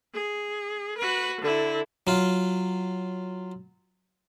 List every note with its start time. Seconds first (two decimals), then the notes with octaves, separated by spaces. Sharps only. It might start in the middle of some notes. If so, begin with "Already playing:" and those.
0.13 G#4
0.98 F#4 B4
1.41 D3 E4
2.07 F#3 F4